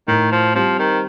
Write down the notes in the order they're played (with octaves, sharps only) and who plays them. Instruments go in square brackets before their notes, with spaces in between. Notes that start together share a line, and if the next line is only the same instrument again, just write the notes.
[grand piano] A2 [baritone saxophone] D#3
[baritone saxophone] F3
[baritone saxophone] F3 [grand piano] G3 C4
[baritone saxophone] D#3